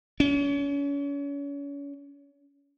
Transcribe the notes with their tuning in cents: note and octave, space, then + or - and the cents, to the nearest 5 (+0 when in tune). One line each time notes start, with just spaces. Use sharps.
C#4 +35